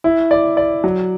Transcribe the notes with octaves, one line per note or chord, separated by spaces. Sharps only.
E4
D5
D5
F#3